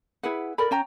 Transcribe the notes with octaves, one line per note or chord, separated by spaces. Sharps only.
E4 G#4 B4 F#5
A4 A#4 D5 B5
C#4 G5 A#5